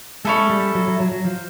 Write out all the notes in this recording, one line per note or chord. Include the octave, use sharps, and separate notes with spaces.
G#3 C#4 E4 A4
G3
F#3
F#3
F#3
F#3
F3